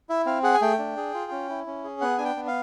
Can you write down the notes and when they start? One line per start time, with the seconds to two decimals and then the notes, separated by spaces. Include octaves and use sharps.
0.09 E4 E5
0.26 C4 F5
0.43 G#4 F#5
0.54 G#5
0.62 A3 G5
0.79 D4
0.97 G#4
1.14 F4
1.31 C#4
1.49 E4
1.66 C#4
1.84 G#4
2.01 B3 F#5
2.18 D4 G#5
2.25 G5
2.36 B3
2.47 F5